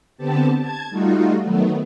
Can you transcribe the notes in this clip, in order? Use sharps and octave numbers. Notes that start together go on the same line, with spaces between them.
D3 B3 C4 G4 A5
A5 G#6
G3 A3 D#4 F4 F#4
D#3 F#3 A3 B3